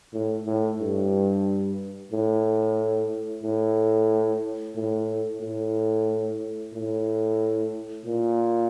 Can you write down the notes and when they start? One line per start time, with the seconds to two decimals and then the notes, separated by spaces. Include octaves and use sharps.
0.13 A2
0.46 A2
0.79 G2
2.12 A2
3.43 A2
4.76 A2
5.41 A2
6.74 A2
8.06 A#2